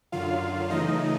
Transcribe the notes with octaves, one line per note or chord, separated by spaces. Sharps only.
F#2 D3 F#3 F4 F5
C#3 E3 A3 D#4 D#5